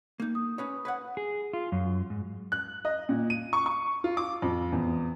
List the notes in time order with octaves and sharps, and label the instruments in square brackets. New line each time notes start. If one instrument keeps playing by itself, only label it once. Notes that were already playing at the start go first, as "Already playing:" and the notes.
[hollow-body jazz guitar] A#3 D#4
[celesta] D#6
[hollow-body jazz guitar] C#4 B4 C#5
B4 C#5 F#5
[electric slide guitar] G#4
F4
F#2
G#2
[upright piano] F#6
D#5
A#2
D#7
C#6
C#6
F4
D6
F2
E2